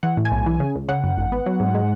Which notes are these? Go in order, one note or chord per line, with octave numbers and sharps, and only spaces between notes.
E3 F#5
A2
G#5
B1
E3
C#3
C#2
C#3 F#5
F#2
G#1
B3
F#3
G#2
G#3